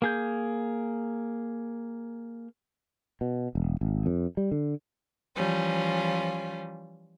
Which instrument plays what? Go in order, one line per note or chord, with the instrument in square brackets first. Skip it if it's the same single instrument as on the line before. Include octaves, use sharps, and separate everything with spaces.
[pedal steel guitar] A#3 G#4 G6
[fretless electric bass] B2
E1
G#1
F2
G3
D3
[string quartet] E3 F3 G3 C#4 F4